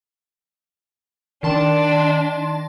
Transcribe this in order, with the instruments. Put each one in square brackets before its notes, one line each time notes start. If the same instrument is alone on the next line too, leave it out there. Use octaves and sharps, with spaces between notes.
[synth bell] D#3 A5 C6 [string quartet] D4